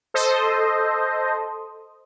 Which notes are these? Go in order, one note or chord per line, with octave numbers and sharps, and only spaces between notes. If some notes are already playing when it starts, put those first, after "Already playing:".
A4 C5 D#5